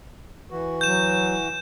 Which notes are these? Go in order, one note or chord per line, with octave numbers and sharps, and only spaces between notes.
E3 F#4
F#3 G6 E7